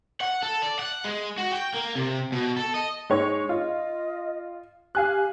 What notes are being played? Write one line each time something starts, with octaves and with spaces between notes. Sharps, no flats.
F#5
A4
D5
F#5
G#3
F#4
G5
A#3
C3
B2
A4
D#5
G#3 D#4 C#5 C#6
F4 D#5
G4 F5 G#5 F#6